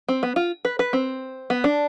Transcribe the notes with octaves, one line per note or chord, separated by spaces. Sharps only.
C4
B3
F4
B4
B4
C4
B3
D4